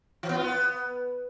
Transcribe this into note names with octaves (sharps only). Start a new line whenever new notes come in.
E3
B3
F4
B3